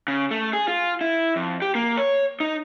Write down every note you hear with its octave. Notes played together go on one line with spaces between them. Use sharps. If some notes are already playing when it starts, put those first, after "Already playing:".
C#3
A3
G#4
F4
E4
F2
G4
A#3
C#5
D#4